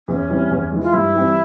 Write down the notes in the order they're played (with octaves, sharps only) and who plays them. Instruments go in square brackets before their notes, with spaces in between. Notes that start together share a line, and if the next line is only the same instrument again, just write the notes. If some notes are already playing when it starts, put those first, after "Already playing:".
[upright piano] E2 [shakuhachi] C#4
[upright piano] E3 G3 C4
E2
E3 G#3
[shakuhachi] F4
[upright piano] G2 [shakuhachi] E4
[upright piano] E3 G3 C4